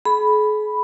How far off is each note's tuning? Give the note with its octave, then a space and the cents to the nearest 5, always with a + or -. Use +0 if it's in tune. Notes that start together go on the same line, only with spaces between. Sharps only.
G#4 +40 B5 +0